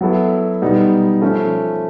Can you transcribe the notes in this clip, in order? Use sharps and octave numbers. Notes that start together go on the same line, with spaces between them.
F#3 B3 E4 A4
B2 G3 B3 D#4
F3 A3 C#4